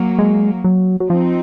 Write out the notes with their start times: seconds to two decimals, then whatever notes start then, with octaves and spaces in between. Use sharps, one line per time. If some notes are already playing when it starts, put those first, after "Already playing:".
Already playing: F#3 A#3
0.19 G#3
0.64 F#3
1.00 F#3
1.10 F3 C4 D#4